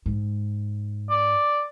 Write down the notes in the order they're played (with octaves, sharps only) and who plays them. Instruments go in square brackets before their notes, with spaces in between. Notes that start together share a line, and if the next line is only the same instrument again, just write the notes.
[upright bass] G#2
[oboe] D5